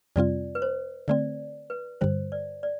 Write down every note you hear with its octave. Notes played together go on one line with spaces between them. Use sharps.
F2 C3 G3 C4 F4 D5
B4
C5
D3 A3 C4 D5
B4
G2 D3 G3 C5
D5
D5